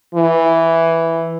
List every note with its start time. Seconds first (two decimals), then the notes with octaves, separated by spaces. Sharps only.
0.15 E3